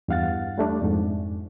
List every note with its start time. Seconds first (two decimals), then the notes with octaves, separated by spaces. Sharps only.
0.08 E2 G2 F5 F#5 A6
0.58 G3 A3 D4
0.82 F2 G#2